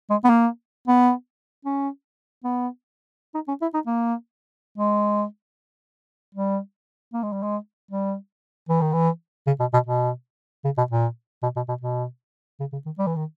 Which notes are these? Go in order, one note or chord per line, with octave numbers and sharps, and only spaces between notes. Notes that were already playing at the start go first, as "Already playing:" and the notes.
G#3
B3
A#3
B3
C#4
B3
D#4
C#4
E4
D#4
A#3
G#3
G3
A#3
G#3
G3
G#3
G3
E3
D#3
E3
C#3
B2
B2
B2
C#3
B2
A#2
B2
B2
B2
B2
C#3
C#3
D#3
G3
E3
D#3